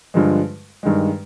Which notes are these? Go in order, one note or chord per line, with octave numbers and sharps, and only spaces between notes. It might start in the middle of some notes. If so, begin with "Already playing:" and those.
G2 D3 F3 G#3
G2 D#3 G#3